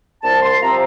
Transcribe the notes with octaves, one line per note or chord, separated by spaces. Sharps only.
C2 A5
C6
C3 F3 C4 A#5